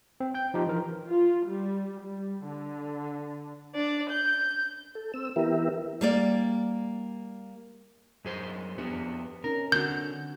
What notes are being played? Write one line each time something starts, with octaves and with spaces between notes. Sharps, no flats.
C4
G5 G6
F3 D#4 G4
E3 F3 A#4
F4
G3
G3
D3
D4 D5
G6
A4
C4 E6
E3 B3 E4 G4 A#4 E5
G3 A#3 D5
F#2 G#4 C5
F2 B3 D4 G4
C4 C#4 D#4 A#4
D3 C4 D4 F#4 G6